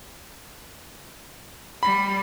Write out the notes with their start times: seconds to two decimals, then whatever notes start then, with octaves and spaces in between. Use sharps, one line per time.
1.83 G3 B5